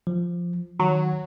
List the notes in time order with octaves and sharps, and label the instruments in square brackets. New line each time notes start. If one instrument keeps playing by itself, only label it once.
[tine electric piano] F3
[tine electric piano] D#3 [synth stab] F#3